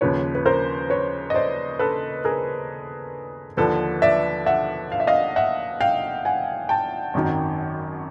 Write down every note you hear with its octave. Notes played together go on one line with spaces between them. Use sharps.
D#2 C#3 F3 B4 C#5
B4
A#4 C5
B4 C#5
D#5
C5 D5
A4 B4
G#4 A#4
D#2 D3 F3 A4 B4
D5 E5
E5 F#5
F5
E5
D#5 F5
E5 F#5
F5 G5
F#5 G#5
G5 A5
G#1 F#2 D#3 F#3